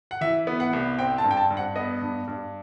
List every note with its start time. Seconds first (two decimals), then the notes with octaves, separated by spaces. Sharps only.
0.11 F#5
0.21 E3 E5
0.47 B3
0.60 F#5
0.73 C2
0.98 C4 G5
1.18 A5
1.24 G2
1.31 G5
1.37 A5
1.51 G2
1.57 F#5
1.76 B3 D#5
2.01 G2
2.28 G2